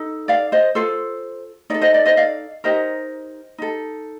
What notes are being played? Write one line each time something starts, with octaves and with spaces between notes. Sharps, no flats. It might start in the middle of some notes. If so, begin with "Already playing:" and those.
Already playing: D#4 A4
D5 F5
C5 D#5
F4 A4 C5
D#4 A4 D5
C5 D#5
D5
C5 D#5
D5 F5
D#4 G4 A#4 C5 D#5
D#4 A4